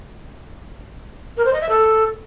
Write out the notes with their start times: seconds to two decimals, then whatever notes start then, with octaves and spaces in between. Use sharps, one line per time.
1.37 A#4
1.45 C5
1.53 D#5
1.61 E5
1.69 A4